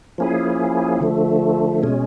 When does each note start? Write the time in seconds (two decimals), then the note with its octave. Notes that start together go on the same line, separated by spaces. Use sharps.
0.18 F3 A#3 C#4 E4 G#4
1.01 D3 F3 A3
1.83 B2 G#3 C#4